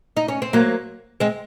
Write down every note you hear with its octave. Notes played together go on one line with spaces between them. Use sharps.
D#4
C#4
C4
F#3 A#3
G#3 C4